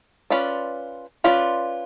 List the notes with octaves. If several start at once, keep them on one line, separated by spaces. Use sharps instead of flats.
C#4 F4 B4 D5
C#4 F4 B4 D5